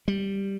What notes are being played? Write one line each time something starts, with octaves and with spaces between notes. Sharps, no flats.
G3